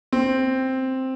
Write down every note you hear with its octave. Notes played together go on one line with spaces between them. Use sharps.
C4